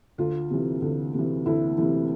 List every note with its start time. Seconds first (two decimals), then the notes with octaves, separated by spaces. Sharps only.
0.18 D2 F4
0.50 C3 E3
0.82 D2
1.14 C3 E3
1.46 D2 E4
1.78 C3 E3 E4